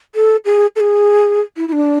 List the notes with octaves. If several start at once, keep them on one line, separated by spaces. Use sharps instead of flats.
A4
G#4
A4
G#4
E4
E4
D4